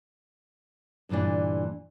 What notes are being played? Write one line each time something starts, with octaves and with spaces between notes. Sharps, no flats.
D2 G2 A#2 E3 D4